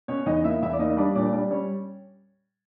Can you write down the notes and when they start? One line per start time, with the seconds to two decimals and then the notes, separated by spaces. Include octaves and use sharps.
0.08 B2 C#4 C#5
0.26 E2 D#4 D#5
0.44 A#3 E4 E5
0.62 E2 E4 E5
0.73 D5
0.79 A#3 D#4 D#5
0.97 G3 D4 D5
1.15 A#2 D4 D5
1.33 G3 D4 D5
1.50 G3 C#4 C#5